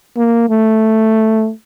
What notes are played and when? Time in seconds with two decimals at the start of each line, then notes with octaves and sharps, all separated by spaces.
0.17 A#3
0.50 A3